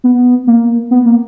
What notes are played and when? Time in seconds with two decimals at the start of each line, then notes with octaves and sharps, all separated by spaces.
0.04 B3
0.47 A#3
0.91 B3
1.06 A#3